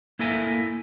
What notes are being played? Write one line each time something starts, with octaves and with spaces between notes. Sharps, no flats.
A#3 E4 A4 A#4 E5 G#5